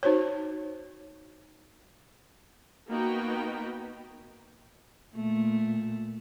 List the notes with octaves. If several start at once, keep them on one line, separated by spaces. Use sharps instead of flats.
D#4 F#4 C5 C#5
A#3 B3 D#4 F#4 B4 G5
A#2 A3